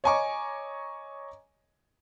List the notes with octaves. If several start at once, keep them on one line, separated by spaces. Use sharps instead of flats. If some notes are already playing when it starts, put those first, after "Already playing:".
C#5 D#5 G#5 A#5 C#6 D6